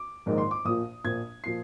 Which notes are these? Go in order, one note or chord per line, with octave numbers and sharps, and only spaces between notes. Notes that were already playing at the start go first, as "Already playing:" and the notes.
Already playing: D6
A#1 G#2 D#3 G#3 D#4
C6
D6
A#1 A#2 F3 D#6
A#1 A#2 F3 G#6
A#2 F3 C7